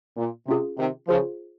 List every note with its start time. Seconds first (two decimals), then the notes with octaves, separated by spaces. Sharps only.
0.17 A#2
0.48 C3 C#4 F4 G#4
0.78 C3 D#3
1.08 C#3 F3 F4 G#4 C5